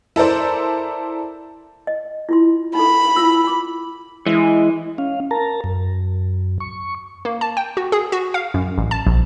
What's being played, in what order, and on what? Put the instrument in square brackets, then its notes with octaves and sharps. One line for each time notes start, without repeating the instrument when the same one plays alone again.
[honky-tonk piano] E4 A4 A#4 C5 D5
[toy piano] D#5
E4 F4 C6
[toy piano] D#4 A4 [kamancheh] B5
[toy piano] E4 F4 E6
D6
[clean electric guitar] E3 [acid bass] G#3
[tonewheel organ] C#4 F5
A#4 A5 A#5
F#2
C#6
[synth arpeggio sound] A#3
A5
G5
F#4
G#4
F#4
F5
F#2
A1
A5
A#1